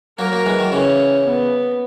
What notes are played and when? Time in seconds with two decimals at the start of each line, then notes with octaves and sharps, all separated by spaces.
0.19 F#3 A#3 A#4
0.32 F#3 A#3
0.46 E3 G#3
0.59 D#3 F#3
0.72 C#3 E3 C#4
1.25 B3